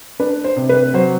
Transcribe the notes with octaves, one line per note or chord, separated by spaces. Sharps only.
D4 B4
C5
C3
B4
F#3 C5